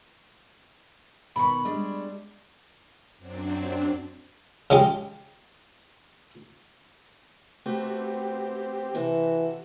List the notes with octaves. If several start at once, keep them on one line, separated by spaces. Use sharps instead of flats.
B2 D#3 B3 B5 C#6
G3 G#3 D4
F#2 F#3 C4 D4
C#3 G#3 G4
A3 C4 F#4 G4 B4
C3 E3 F#4 A4